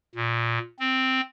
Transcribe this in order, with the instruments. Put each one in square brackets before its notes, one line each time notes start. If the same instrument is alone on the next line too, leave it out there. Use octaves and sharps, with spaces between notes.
[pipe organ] A#2
C4